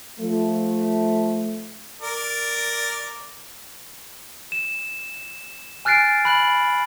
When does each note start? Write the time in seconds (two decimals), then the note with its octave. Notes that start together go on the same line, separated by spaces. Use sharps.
0.20 F3 A3
2.02 A#4 D5
4.52 E7
5.85 G#5 F6 F#6 A6 C7 D7
6.25 B5 F#6 F#7